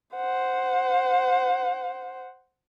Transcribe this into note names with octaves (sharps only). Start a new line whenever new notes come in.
C5 F#5